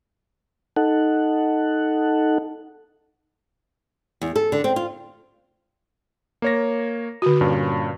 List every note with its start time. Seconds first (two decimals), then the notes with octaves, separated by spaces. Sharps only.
0.77 D#4 A4 F#5
4.22 E2
4.36 A4
4.52 D3
4.64 C4
4.76 F4
6.42 A#3 C#5 A#6
7.22 D3 F#4
7.41 G2 A#2 C#4